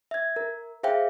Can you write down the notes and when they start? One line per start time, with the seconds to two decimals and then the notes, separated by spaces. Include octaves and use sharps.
0.11 E5 G#6
0.36 A#4
0.83 G#4 C5 E5 F5 G5